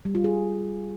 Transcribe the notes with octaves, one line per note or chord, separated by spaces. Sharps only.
G3
F4
G#4